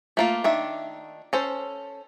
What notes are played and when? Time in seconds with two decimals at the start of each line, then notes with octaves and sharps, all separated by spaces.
0.17 A3 A#3 F4
0.44 D#3 D4 E5
1.33 C#4 A4 C5